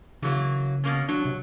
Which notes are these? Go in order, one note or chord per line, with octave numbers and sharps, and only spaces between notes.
C#3 E3 F#3 A#3
B2 A#3 C#4
F#3 D4
C3